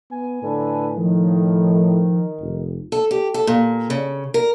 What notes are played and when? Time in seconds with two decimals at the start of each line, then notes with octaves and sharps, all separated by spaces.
0.11 B3 G#5
0.43 A2 D3 A4 B4
0.96 D#3 F3
2.40 F1
2.92 A4
3.11 G4
3.34 A4
3.47 A#2
3.90 C#3
4.34 A#4